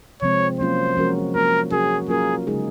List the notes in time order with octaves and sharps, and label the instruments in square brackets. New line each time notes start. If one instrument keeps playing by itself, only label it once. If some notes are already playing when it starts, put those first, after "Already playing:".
[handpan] C3 F3 G#3 C4 [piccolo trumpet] C#5
[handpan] F#3 A#3 C#4 F4 [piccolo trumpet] C5
[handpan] F3 G#3 C#4 F#4 A#4
[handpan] F#3 A#3 F4 [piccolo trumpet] A#4
[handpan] C3 F#3 C#4 F#4 A#4 [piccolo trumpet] G#4
[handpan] F#3 A#3 C#4 F4 A#4 [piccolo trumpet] G#4
[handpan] C#3 G#3 D#4 G#4